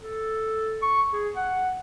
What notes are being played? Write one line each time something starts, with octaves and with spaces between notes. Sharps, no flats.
A4
C#6
G#4
F#5